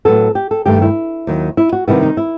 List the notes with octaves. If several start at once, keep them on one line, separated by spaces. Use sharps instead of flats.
A2 F#3 B3 A4
G4
A4
G2 D#3 A3 G4
E4
D#2 D#3 F#3
E4
F#4
C3 D#3 G3 B3 E4
D#4
E4